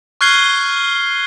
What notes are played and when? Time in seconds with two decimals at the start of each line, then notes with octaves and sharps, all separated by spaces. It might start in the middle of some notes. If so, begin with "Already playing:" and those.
0.21 C#6 F6 F#6 G#6 C7 G7